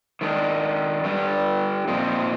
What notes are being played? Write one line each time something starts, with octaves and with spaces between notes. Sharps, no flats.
D#3 G#3 D4
D3 G3 D4
A#2 F3 C4 D#4